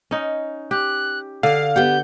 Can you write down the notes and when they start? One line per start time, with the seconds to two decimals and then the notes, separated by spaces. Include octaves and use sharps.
0.11 C#4 D#4
0.71 G4 F#6
1.43 D3 F5 C7
1.76 B3 G4 F#5 G6